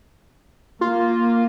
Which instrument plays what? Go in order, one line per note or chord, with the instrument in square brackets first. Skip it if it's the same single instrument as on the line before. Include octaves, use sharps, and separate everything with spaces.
[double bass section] A#3 [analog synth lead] F4